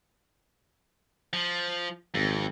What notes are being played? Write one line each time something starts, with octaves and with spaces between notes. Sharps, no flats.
F3
G#1 F2